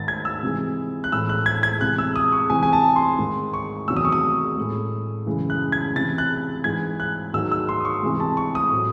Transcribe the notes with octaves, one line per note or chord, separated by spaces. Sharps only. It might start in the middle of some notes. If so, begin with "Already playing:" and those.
Already playing: G#2 D#3 G#3 A6
G#6
E6
C3 E3 G#3
F#6
A2 E3 G#3 E6
F#6
G#6
G#6
C3 E3 G#3 F#6
E6
D#6
C#6
C3 E3 G#3 G#5
G#5
A5
C6
G#2 D#3 G#3
C#6
E2 C3 D#3 F#3 E6
D#6
C#6
D#6
A2 G#3
F#2 C#3 E3 G#3
F#6
G#6
C3 E3 G#3 A6
F#6
G#2 E3 G#3 G#6
F#6
G#2 D#3 F#3 E6
E6
C6
D#6
C#6
C3 E3 G#3
A5
C#6
D#6
A2 F#3